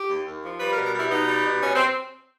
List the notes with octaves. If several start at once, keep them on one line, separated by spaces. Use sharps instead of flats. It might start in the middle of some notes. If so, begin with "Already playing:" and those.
Already playing: G4
D#2
D#2
F3
G3 B4
A#4
B2
A#4
G3 E4
B2 D#4
G3
B2
B2 C#4
C4